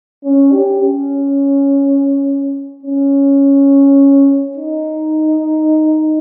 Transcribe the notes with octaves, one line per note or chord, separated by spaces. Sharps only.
C#4
G4
C#4
C#4
D#4